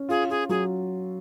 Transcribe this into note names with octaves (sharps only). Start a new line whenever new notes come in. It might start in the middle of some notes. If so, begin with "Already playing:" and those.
Already playing: C#4
F4 G#4
F4 G#4
F#3 G#4